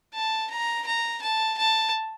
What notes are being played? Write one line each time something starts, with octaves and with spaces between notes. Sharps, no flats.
A5
A#5
A#5
A5
A5